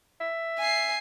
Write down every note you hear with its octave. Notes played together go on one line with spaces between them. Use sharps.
E5
G#5 C7